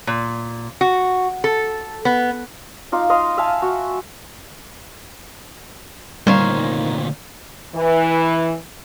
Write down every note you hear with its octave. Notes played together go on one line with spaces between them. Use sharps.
A#2
F#4
A4
B3
D#4 F4 D6
D#5 F5 C6
E5 F5 G#5 A5
F#4
D2 A#2 D#3 G3 D#4 C5 C#5 F5
E3